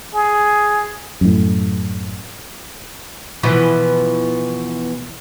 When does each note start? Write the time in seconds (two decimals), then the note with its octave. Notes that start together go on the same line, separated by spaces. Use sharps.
0.15 G#4
1.21 F#2 A2
3.43 B2 E3 F3